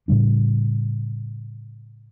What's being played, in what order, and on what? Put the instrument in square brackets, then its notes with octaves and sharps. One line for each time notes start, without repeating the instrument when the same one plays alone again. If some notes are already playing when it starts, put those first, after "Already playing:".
[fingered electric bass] A2 C#3 G3 D4